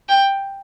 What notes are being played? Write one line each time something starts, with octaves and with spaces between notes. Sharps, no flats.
G5